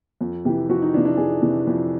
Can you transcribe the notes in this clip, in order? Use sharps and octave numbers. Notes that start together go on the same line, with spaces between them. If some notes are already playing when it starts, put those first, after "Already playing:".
F2
C3 E3 G4
F2 F#4
D#4
C3 E3 D4
D4
F2 G#4
C3 E3
F2